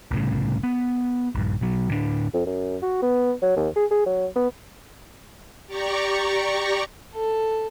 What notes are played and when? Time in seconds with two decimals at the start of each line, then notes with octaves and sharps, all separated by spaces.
0.11 C2 A2 C#3
0.63 B3
1.35 A#1 G2
1.61 B2 F#3
1.89 D2 A2 A#3 D4
2.34 F2
2.46 F#2
2.82 F#4
3.02 B3
3.42 F#3
3.57 D#2
3.76 G#4
3.91 G#4
4.06 F#3
4.36 B3
5.67 G4 D5 A#5 C#6
7.15 A4